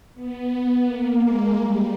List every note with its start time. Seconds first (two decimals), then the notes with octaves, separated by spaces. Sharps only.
0.14 B3
0.48 B3
0.83 A#3
1.18 G#3
1.51 G3